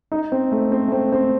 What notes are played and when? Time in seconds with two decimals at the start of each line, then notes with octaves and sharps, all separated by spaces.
0.12 D#4
0.32 C4
0.52 A3
0.72 C4
0.88 A3
0.92 C4
1.12 C4